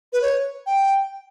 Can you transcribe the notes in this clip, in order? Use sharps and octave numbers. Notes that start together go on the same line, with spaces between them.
B4
C#5
G5